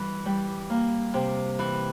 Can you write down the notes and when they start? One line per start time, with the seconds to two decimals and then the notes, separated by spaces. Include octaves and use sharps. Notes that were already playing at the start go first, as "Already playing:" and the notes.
Already playing: E3 G3
0.25 G3
0.70 A#3
1.14 C3
1.59 E3